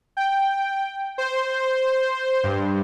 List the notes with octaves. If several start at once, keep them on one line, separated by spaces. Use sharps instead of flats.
G5
C5
G2